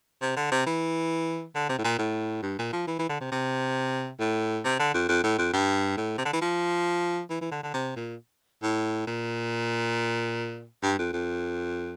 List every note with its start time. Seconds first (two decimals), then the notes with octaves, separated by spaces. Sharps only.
0.21 C3
0.36 D3
0.51 C3
0.66 E3
1.55 D3
1.69 C3
1.78 A2
1.84 A#2
1.99 A2
2.42 G2
2.58 A#2
2.72 F3
2.87 E3
2.99 E3
3.09 D3
3.20 C3
3.31 C3
4.20 A2
4.65 C3
4.79 D3
4.94 F2
5.09 F2
5.23 A2
5.38 F2
5.53 G2
5.97 A2
6.18 C3
6.25 D3
6.33 E3
6.41 F3
7.30 E3
7.41 E3
7.51 D3
7.63 D3
7.74 C3
7.96 A#2
8.63 A2
9.07 A#2
10.83 G2
10.98 F2
11.13 F2